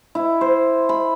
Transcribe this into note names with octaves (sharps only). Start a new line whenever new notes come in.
E4
C5
B5